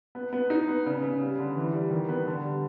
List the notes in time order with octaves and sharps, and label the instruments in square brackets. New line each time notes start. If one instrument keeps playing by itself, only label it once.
[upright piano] B3
B3
D#4
B3
C#3
C#3
G3
D3
E3
G3
D#3
B3
D3
G3